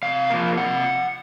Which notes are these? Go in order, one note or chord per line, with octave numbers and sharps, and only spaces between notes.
C3 F5
F3 A#3
C3 F#5